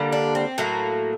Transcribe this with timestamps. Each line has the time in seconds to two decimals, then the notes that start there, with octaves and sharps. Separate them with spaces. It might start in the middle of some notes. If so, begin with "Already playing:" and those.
Already playing: D3 G3 A#3
0.12 D4
0.35 C4
0.58 A2 F#3 A#3